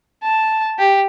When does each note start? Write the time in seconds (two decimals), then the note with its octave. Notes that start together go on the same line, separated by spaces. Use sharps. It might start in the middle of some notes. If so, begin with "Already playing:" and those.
0.23 A5
0.79 G4